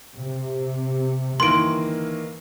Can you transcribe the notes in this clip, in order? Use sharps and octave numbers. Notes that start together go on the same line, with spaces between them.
C3
G1 D#3 E3 A#3 C6 D7